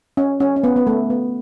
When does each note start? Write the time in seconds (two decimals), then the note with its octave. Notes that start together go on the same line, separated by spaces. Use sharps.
0.17 C#4
0.40 C#4
0.56 C#4
0.64 B3
0.76 B3
0.87 A3
1.10 B3